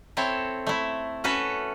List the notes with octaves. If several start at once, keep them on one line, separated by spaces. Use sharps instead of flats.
C4 E4 A4 C#5
A3 E4
C#4 F#4 A4 B4 C#5